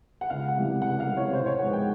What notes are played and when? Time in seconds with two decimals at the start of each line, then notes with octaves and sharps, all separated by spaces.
0.21 F#5
0.30 C#2 F5
0.48 F#5
0.57 C3 E3 G3
0.82 C#2 F#5
1.00 F5
1.08 C3 E3 G3
1.17 C#5
1.33 A1 C5
1.46 C#5
1.59 G#2 F3 G#3 B3 F#5
1.73 G5